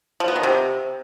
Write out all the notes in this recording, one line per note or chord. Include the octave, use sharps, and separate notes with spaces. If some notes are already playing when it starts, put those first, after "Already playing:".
F3
B3
D#3
C3